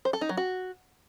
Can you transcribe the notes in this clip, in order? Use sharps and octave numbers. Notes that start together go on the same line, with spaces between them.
C5
A4
D#4
F#3
F#4